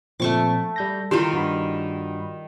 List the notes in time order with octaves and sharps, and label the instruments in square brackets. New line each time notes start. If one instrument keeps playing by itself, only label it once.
[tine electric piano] A#2 F3 C4 [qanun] A3 C#6 D6
[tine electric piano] G3 G6 A#6
[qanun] D#3 G3 F4 [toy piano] E4 G4 [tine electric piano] C6
[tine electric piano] G2 F#4 B5